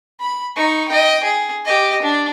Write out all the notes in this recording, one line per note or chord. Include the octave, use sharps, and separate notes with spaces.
B5
D#4 C#6
D#5 G5
G#4
G4 D#5
D4